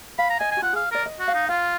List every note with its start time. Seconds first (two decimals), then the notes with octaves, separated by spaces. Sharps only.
0.18 F5 B5
0.30 A#5
0.40 D#5 G#5
0.51 G#5
0.57 F#4
0.62 F4 F#5
0.73 G#4 F5
0.91 A#4 D5
1.06 D#5
1.20 F#4
1.28 F5
1.35 D#4
1.49 F4 F5